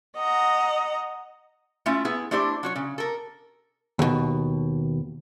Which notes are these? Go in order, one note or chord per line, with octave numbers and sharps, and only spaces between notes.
D#5 F#5 A#5
A3 C#4 E4 F4
B3 E4 G#4
A3 D4 E4 G4 C5
F#3 F#4 C#5
C#3
A4 A#4
D#2 B2